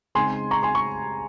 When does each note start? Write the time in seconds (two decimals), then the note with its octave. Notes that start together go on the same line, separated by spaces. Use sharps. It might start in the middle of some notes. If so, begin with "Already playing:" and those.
0.15 C#3 G#3 C4 D#4 G#5 C6
0.51 A#5 C#6
0.63 G#5 C6
0.75 C#6